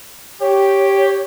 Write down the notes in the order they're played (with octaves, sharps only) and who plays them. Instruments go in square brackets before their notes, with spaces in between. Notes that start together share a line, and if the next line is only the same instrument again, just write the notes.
[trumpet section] G4 [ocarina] C#5